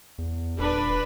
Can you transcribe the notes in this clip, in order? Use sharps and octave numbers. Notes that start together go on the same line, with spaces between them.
E2
D#1 D4 B4